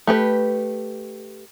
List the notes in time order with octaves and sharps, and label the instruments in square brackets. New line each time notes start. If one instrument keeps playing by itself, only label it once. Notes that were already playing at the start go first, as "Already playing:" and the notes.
[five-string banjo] A3 G4 B4